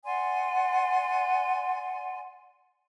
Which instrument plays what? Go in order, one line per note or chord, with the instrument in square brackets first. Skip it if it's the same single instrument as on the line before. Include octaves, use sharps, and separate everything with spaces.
[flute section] D5 F#5 G#5 C6